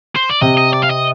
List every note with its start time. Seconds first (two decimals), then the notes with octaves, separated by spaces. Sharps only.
0.16 C5
0.29 D5
0.41 C3 C4 D#5
0.57 D#5
0.73 D5
0.83 F5
0.90 D#5